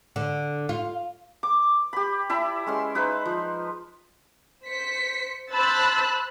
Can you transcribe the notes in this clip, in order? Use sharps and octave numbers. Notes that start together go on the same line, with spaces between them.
D3
F4
D6
G4 B5
E4 E5 A5 B5
G#3 C#4 C6
D#4 B4 C5 E5
F3
C5 B6 C#7
C5 A5 B5 E6 F#6 A6